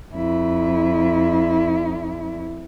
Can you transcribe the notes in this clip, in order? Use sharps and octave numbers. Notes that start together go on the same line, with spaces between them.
F2 E4